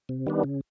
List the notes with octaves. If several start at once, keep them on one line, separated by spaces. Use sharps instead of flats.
C3
D#3 G3 B3 D4
C#3